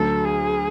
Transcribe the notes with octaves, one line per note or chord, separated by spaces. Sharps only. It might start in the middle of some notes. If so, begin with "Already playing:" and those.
Already playing: D2 D3 F#3 A4
G#4